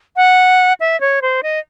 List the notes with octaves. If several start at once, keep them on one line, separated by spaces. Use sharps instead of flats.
F#5
E5
C#5
C5
D#5